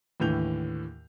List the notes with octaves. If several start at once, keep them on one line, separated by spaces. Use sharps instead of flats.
D#2 A2 D3 E3 G6 F7